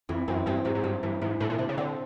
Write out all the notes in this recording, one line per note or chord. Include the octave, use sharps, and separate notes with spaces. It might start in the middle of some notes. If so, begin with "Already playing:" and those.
F2 E3
F#2 C4
G2 C4
G#2 F#3
G#2
G2 F#3
G2 E3
G#2 E3
A2 D4
A#2
C3 D4
C#3
D3 C4